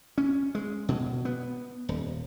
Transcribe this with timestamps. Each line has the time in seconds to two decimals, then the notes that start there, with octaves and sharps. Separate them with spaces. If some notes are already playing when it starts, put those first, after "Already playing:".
0.18 C#4
0.55 G#3
0.89 B2
1.25 B3
1.89 D#1